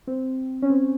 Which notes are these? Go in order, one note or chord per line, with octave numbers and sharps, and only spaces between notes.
C4
C#4
C4